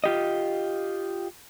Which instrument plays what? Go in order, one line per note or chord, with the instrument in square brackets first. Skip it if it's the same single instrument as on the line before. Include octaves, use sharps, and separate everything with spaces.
[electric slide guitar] F4 G4 D#5